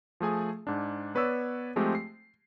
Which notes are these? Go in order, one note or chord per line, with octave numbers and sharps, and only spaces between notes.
F3 A3 G#4 G#5
G#2 D4
B3 B4 C#5 D5 E6
F3 G#3 A3 C4 G4
C7